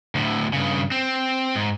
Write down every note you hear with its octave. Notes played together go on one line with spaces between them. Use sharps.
D2 A2
G2 C#3
C4
G#2